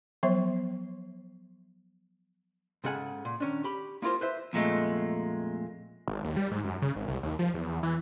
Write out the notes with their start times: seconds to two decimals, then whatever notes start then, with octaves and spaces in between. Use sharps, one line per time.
0.23 F3 F#3 B3 C5 E5
2.84 G#2 C#3 A4 F#5 G#5
3.25 A#2
3.40 D#3 C#4 D4
3.64 G4 B5
4.02 A#3 E4 F4 A#4 C5
4.21 B4 C5 E5
4.53 F2 A#2 G#3 A3
6.08 G#1
6.24 D#2
6.37 G3
6.52 G#2
6.64 F#2
6.82 C#3
6.96 G#1
7.08 C2
7.23 D#2
7.39 F3
7.54 E2
7.83 E3